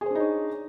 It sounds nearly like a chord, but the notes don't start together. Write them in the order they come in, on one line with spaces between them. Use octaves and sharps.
G#4 C5 D4 D#4 C#5